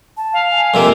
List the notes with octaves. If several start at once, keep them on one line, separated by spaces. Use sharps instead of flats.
A5
F5
G#5
F2 C3 A#3 E5